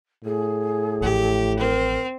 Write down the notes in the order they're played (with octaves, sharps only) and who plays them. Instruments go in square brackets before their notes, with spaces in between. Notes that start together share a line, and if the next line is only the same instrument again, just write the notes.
[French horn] A2 [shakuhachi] G#4
[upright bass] A1 F3 [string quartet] G4
[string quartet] C4 [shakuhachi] A#4